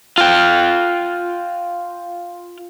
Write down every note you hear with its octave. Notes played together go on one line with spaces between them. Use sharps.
F4 G5